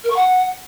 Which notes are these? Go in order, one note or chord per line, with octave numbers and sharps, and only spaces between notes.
A#4
C#6
F#5